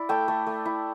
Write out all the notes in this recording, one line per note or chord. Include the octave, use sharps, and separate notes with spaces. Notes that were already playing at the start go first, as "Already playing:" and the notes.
Already playing: E4 D5
A3 G5
A3
A3
E4